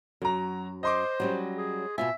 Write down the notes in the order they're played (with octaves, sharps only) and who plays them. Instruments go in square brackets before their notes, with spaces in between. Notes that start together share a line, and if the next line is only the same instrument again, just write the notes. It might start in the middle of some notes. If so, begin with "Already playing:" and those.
[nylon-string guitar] F#2 [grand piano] F#3 A#5
[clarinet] C5 [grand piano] D#5 C6 D6
[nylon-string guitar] F#3 G3 C#4
[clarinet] G#4
[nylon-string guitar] B2 F4 G#5 [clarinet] E5